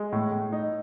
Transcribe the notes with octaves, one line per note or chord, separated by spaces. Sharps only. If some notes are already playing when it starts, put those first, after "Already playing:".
Already playing: G#3
A2
A2
D#4